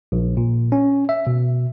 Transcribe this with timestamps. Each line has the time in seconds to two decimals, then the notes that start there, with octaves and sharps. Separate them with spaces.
0.12 A#1
0.37 A#2
0.72 C#4
1.09 E5
1.27 B2